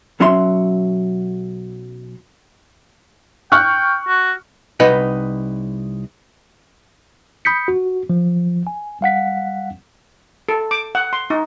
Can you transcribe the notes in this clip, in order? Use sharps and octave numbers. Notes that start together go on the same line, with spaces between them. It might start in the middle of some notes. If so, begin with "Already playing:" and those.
B1 F#3 C#4 F#4 E5 C6
G5 C#6 F6 F#6
F#4
C2 D#4 B4 D#5 F#5
B5 D#6 G6 B6 C#7
F#4
F3
G#5
G3 F5 F#5 B6
A4
D6
F#5
C6
D#4